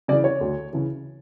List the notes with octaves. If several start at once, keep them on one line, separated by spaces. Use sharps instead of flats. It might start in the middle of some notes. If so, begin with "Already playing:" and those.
C#3 E3 D5
C#5
D2
C#3 E3